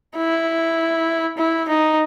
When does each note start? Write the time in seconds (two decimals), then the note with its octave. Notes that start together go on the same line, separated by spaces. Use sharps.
0.16 E4
1.38 E4
1.68 D#4